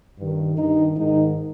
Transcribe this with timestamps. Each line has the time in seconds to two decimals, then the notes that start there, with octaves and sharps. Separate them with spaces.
0.20 G2 D#3
0.57 G2 D#3 D#4
0.96 G#2 D#3 D#4